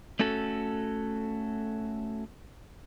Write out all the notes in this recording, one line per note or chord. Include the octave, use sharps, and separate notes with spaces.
A3 C#4 F#4 A4